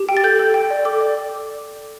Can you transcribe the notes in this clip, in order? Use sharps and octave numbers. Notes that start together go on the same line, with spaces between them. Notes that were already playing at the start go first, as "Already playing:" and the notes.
Already playing: G4
G5
A6
A4 G6
A4
G5
D5
A4 D6
D5